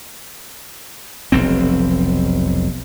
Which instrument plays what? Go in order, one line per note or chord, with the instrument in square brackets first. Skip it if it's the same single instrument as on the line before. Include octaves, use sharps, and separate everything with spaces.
[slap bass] F1 B1 C4